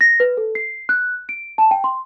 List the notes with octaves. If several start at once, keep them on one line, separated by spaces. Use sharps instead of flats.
A#6
B4
A4
C7
F#6
D7
A5
G5
C6